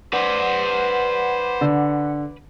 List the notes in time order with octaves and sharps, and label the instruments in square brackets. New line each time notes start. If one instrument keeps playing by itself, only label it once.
[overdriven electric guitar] B4 D5 [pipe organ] C5 [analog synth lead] F#5
[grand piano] D3